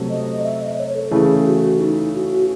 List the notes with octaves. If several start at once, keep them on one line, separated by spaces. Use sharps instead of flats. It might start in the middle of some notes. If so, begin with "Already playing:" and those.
Already playing: C3 F#3 A3
D#5
E5
D#5
C#5
A4
C#3 E3 A3 G#4
G#4
F#4
D#4
F#4